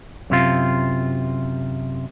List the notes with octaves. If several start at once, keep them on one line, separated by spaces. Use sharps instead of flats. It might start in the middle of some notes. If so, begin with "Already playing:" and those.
F#2 C3 F4